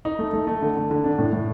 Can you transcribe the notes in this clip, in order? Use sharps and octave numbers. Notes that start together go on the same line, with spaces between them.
D#4
A3
A3
A3
D3
D3
D3
D4
A2
A2